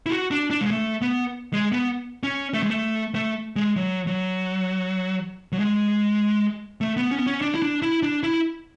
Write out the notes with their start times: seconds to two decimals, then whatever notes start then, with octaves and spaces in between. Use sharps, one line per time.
0.06 E4
0.10 F#4
0.31 D4
0.50 D4
0.61 G#3
0.71 A3
1.02 B3
1.53 G#3
1.73 B3
2.23 C#4
2.54 A3
2.63 G#3
2.70 A3
3.15 A3
3.56 G#3
3.76 F#3
4.07 F#3
5.52 F#3
5.59 G#3
6.81 A3
6.97 B3
7.11 C#4
7.19 B3
7.27 C#4
7.42 D4
7.54 E4
7.62 D4
7.82 E4
8.03 D4
8.23 E4